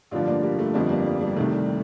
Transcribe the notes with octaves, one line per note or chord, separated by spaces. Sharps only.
A1 G2 D3 F3 D4 F4
A#3 D4
G3 A#3
A3
G1 F2 D3 F3 G3
G3 A#3
G3
G3
C2 C3 D#3 A3
G3